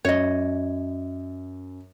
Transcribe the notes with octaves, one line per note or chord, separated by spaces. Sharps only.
F#2 C#5 D#5